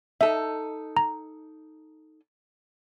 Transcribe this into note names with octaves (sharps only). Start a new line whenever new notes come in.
D#4 A4 E5
A#5